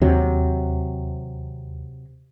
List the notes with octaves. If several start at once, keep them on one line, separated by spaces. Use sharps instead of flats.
D#2 C3 F#3